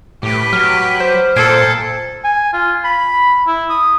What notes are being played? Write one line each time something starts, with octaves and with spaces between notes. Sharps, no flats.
A2 G4 B4
F#3 F6
C5
A#2 A4 G#6 C7 D7
G#5
F4
B5
E4
D#6